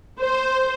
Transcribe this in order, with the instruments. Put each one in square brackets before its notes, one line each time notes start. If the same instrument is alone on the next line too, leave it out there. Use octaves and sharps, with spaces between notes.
[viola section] C5